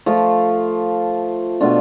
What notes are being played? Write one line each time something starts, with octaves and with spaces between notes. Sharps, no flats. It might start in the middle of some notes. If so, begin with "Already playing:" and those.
F3 A3 F4
B2 A3 D4 F4